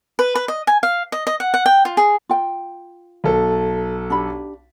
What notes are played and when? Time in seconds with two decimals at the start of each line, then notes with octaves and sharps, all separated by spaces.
0.19 B4
0.35 B4
0.48 D#5
0.67 G#5
0.83 F5
1.12 D#5
1.27 D#5
1.40 F#5
1.54 F#5
1.66 G5
1.85 F4
1.97 G#4
2.29 F4 G5
3.24 B1 A4
4.10 D4 G4 B5